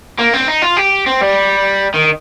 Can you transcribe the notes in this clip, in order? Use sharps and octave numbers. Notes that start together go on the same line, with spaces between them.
A#3
C4
D#4
F4
G4
C4
G3
D#3